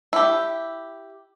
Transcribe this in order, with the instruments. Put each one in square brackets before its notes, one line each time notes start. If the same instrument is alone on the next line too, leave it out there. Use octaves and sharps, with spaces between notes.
[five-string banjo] E4 G4